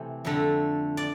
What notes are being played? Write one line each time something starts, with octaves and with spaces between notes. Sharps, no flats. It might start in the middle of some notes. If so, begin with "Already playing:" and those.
Already playing: C3 E3 A3 C4
F2 D3 A3
D5